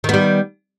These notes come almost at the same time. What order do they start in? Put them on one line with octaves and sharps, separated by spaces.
D#3 B3 G3